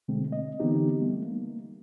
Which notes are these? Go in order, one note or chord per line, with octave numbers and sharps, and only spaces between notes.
B2 D3 G#3 A3 C4
D#5
D3 E3 B3 C4 D#4 G4
G3 A3 B3
A#3